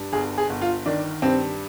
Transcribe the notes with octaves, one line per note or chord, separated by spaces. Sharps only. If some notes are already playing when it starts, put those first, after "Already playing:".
Already playing: G2
G1 G#4
G#4
G1
F4
D#3 D4
G2 C4